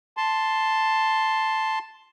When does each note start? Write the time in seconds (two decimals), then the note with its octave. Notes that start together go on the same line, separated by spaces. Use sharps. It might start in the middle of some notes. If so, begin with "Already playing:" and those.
0.17 A5 C6